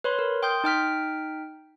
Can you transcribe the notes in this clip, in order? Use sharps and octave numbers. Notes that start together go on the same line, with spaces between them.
B4 C#5 B5 C6
A#4
G5 C6 D#6 F6 G6
D#4 G5 F6 B6